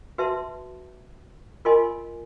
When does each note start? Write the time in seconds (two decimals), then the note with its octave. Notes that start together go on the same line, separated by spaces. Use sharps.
0.18 F#4 B4 E5 A5 C6
1.65 F4 A#4 D#5 G#5 C6